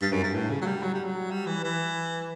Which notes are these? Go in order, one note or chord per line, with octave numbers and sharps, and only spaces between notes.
G2
F#2
G2
A2
C#3
F#3
G3
F#3
G3
F#3
G3
E3
E3